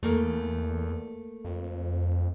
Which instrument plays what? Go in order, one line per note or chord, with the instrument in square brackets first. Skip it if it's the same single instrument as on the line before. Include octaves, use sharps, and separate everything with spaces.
[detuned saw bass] E2 [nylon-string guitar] A3 A#3
[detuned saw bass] F2